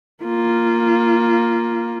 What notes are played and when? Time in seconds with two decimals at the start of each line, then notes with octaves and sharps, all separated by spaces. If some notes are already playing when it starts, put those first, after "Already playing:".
0.24 A#3 F4